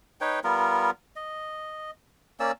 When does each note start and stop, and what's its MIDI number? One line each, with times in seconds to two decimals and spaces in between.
0.21 0.40 63
0.21 0.40 71
0.21 0.40 73
0.21 0.40 79
0.44 0.91 55
0.44 0.91 59
0.44 0.91 65
0.44 0.91 70
1.16 1.91 75
2.40 2.52 58
2.40 2.52 61
2.40 2.52 74
2.40 2.52 88